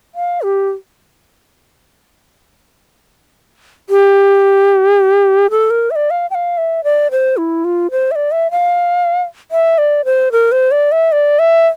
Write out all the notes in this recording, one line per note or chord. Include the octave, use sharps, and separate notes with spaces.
F5
G4
G4
A4
A#4
E5
D5
F5
G5
F5
E5
D5
C5
E4
F4
C5
E5
D5
E5
F5
E5
D5
C5
A#4
C5
D5
E5
D5
E5